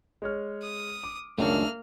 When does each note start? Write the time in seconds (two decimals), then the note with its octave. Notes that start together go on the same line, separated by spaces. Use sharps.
0.22 G#3 C#5 F6
0.62 D#6
1.03 D6
1.38 C#2 F#2 D#3 A3 A#3 D4 A4 F6